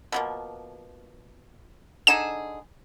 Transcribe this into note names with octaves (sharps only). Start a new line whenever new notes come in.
B2 F3 A#3
D3 D#4 G#4 E7